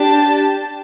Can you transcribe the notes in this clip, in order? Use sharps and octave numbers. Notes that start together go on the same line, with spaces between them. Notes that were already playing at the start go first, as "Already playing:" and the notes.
Already playing: D4 G4 A5